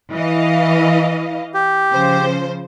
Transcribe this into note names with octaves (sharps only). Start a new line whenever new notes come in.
E3 D#5 F5
G4
C#3 F3 C5